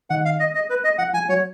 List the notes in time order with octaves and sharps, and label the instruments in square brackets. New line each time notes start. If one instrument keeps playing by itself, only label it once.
[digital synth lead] D#3 [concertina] F#5
[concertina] F5
D#5
D#5
B4
D#5
[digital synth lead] F3 [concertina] F#5
[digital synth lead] F3 [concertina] G#5
[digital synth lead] F#3 [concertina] C#5